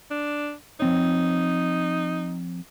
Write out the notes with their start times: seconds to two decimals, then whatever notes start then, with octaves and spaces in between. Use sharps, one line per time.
0.11 D4
0.80 F3 C4 D#4 C#5